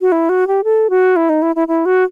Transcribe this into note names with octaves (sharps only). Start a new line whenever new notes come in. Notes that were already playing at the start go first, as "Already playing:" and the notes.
F#4
E4
F#4
G4
A4
F#4
E4
D#4
E4
E4
E4
F#4